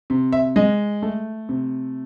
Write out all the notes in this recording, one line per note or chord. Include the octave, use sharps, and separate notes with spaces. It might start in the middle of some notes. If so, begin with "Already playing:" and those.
C3
E5
G#3 D#5
A3
C3